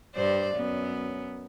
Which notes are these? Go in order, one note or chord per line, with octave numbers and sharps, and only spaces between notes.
G2 C5 D5
F#2 B3